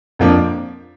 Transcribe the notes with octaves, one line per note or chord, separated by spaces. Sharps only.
F2 F3 A#3 D4